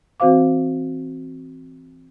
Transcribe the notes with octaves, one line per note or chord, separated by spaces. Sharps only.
E3 C4 F#4 C5 F5 D6